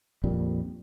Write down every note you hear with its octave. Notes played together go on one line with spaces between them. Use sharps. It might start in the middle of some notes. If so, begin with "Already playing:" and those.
A#1 F2 A#2 G3